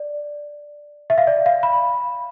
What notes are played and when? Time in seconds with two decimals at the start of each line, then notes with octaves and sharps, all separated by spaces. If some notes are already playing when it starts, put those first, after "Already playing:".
Already playing: D5
1.10 E5
1.18 F5
1.27 D5
1.46 F5
1.63 B5